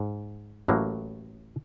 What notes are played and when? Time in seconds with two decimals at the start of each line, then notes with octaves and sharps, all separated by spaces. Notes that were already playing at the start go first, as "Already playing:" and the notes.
Already playing: G#2
0.68 A1 A2 F#3 A#3